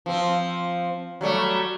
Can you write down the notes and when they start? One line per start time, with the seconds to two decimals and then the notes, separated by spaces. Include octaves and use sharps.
0.06 F3 C4
1.21 F#3 G3 A3